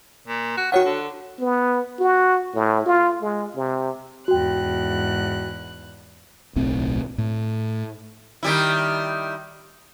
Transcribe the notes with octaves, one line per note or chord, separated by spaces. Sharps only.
A#2
F#4
D#3 F#4 C#5 F#5
D3
B3
F#4
A2
F4
G#3
C3
E2 G#2 F#4 G5 F#6
D1 B1 A2 C4
A2
D#3 G3 E4